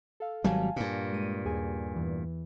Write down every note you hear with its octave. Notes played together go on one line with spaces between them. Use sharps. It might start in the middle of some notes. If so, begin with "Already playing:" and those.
A4 F5
G#1 F#3 G3 F5 G#5 A5
G2 A#2
G#3 D#7
D#2 G#4 G#5
E2 E3